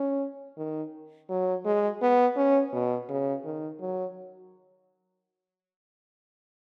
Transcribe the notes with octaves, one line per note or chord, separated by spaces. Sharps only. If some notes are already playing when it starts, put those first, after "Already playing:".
Already playing: C#4
D#3
F#3
G#3
B3
C#4
B2
C#3
D#3
F#3